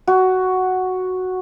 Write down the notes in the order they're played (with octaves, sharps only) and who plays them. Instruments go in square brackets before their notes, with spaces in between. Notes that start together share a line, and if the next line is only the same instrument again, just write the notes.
[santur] F#4